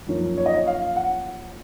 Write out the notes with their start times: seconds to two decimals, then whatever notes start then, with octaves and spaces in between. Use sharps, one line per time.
0.07 F#2 F3 A#3 C#4
0.37 C#5
0.46 D#5
0.54 C#5
0.67 F5
0.96 F#5